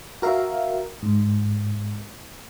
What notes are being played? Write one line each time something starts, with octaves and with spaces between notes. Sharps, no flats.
F#4 A#4 E5 F5
G#2